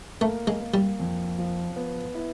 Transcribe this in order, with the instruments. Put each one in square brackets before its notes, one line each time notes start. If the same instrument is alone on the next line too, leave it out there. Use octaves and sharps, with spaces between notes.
[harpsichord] A3 [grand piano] A#3
[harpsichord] G#3
[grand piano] A#3
[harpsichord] G3
[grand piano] F2
F3
B3
E4